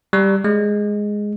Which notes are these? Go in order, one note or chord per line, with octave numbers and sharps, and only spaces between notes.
G3
G#3